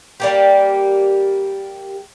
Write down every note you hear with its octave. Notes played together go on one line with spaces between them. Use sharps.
G3 A#3 G4